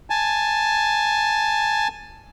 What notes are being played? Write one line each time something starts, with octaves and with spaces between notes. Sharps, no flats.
G#5 A5